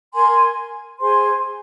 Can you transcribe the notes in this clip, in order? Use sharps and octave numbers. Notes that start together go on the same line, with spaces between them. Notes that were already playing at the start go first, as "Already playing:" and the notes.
A#4 G#5 C6
G#4 C5 G#5 C6